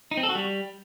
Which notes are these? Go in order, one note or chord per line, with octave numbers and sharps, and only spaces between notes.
D#4
C4
A4
F#4
G3